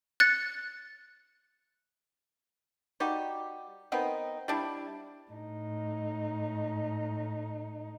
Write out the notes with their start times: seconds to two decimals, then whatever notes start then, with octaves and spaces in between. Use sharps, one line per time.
0.20 F#6 A6 C#7
3.00 G3 D#4 F#4 G4
3.92 D#3 B3 C4 D#4
4.48 G3 D4 E4
5.32 A2 D#4